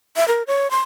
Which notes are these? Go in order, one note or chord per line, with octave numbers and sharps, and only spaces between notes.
E5
A#4
C#5
C6